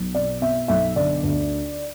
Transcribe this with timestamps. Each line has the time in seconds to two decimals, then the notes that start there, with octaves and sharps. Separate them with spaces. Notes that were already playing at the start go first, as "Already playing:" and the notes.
Already playing: B1
0.14 B2 D5
0.41 B2 E5
0.68 B1 E5
0.96 D3 D5
1.23 D2